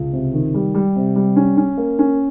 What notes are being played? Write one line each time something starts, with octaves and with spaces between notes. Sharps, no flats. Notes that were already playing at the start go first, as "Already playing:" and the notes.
Already playing: C#2
C3
D#3
G3
G3
C3
G3
C#4
C#4
A#3
C#4